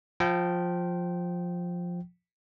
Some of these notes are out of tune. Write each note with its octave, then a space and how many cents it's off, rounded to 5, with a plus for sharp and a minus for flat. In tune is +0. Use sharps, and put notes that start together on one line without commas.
F3 +10 G5 -15